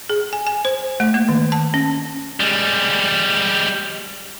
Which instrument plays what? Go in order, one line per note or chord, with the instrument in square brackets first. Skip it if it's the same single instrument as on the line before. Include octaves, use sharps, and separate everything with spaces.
[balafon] G#4
G#5
G#5
C5
A3
A#3
D#3
A5
C#4
[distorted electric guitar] G3 G#3